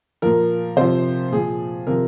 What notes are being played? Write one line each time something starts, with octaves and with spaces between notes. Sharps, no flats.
A#2 F3 A#4
C3 F3 C5
A#2 F3 G#4
C3 F3 A#4